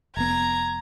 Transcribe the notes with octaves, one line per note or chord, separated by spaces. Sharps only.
F1 B3 A#5 G#6